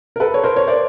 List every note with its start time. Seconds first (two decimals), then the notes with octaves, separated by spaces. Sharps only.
0.16 A#4
0.20 A4 B4
0.34 C#5
0.43 A#4 C5
0.56 C#5
0.67 C5 D5